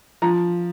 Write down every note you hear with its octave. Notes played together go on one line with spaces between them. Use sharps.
F3 A#5